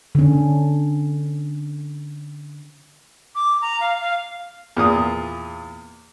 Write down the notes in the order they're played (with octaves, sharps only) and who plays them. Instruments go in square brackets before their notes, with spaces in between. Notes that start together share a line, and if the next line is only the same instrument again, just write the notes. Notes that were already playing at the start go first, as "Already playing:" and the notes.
[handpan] D3 C#4
[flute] D6
A#5
F5
F5
[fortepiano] E2 A#2 D#6